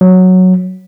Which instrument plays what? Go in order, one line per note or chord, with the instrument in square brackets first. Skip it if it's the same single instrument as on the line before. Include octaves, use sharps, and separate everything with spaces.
[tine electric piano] F#3